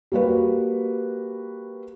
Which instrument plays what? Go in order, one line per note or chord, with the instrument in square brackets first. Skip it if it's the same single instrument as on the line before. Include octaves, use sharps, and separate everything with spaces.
[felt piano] G3 A#3 F#4 B4